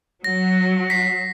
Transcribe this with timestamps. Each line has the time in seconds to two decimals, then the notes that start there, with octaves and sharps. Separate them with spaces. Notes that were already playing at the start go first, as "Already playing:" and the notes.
0.24 F#3 A#6
0.90 B6 C7